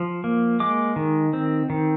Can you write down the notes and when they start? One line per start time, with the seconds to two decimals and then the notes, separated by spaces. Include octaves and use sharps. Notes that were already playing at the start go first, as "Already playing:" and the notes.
Already playing: F3
0.24 A#3
0.60 G#3 D6
0.96 D#3
1.33 C4
1.70 D#3